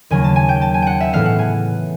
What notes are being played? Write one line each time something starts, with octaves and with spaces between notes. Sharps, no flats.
D#2 C#3 F#3 A#3 G#5
A5
G#5
G5
A5
G#5
F#5 G5
E5
A2 E3 G#3 B3 F5
F#5
G#5